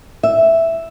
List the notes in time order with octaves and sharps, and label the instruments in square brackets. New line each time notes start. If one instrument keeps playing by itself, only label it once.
[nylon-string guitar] E5